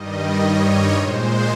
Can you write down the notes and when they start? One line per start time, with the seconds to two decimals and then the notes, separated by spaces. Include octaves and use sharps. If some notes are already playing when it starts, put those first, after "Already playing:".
Already playing: G2 D#3 G3 D#5
0.41 C#5
0.93 A#2 G#3 C5